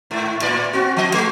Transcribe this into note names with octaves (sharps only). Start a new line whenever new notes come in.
G#2
A2 D5
C4 F#4
F3 D#5
G#3